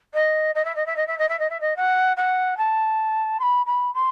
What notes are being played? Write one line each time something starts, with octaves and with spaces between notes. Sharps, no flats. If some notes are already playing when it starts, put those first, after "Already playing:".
D#5
D#5
E5
D#5
E5
D#5
E5
D#5
E5
D#5
E5
D#5
F#5
F#5
A5
C6
B5
B5
C6